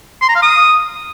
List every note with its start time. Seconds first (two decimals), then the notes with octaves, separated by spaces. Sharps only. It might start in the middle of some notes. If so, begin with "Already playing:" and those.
0.22 C6
0.29 A#5
0.35 F5
0.42 D#6